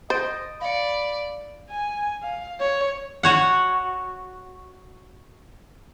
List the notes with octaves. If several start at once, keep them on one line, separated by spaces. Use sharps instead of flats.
C5 D#5 A6 D7
D5 F5 B5 C#7
G#5
F5
C#5
F#4 C#5 F#5